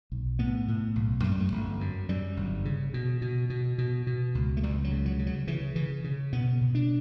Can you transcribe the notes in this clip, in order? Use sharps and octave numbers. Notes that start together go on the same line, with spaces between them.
B1
A2 B3
A2
B1
F#2 A3
G3
A3
G1
F#2
F#2 G3
G1
C#3
B2
B2
B2
B2
B2
C#2
A3
C#2 G3
F#3
C#3
F#3
C#3
F#3
C#3 E3
C#3 E3
C#3
B2 B3
B2
D4